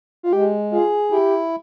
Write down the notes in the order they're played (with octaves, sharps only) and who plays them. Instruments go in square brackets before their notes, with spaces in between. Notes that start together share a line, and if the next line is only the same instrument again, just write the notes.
[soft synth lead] F4
[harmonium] G#3 [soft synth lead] G4
[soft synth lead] F4 [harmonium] G#4
[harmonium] E4 [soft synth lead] G4